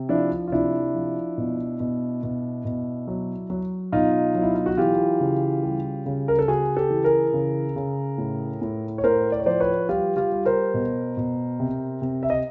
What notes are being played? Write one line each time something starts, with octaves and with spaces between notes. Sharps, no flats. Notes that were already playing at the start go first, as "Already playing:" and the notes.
Already playing: C3
F3 D4 E4
F4
C3 D4 E4
F3
B2
B2
B2
B2
F#3
F#3
B2 D#4 F4
F#3
E4
F4
F#4
E3 F4 G4
C#3
G3
C#3
A#4
A4
C#3 F#4 G#4
G4 A4
E3
G#4 A#4
C#3
C#3
A2
A2
C#5
A2 A#4 C5
D5
C#5
F3 C5 D5
B4 C#5
G3 F4 G4
F4 G4
G3
A#4 C5
B2
B2
C3
C3
E5
D#5